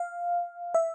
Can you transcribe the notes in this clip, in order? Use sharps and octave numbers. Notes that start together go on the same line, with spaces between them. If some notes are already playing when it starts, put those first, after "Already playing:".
Already playing: F5
E5